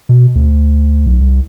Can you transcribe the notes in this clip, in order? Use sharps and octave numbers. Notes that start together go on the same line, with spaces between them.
B2
D2
B1
C2